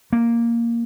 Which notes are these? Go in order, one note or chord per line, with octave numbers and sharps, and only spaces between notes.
A#3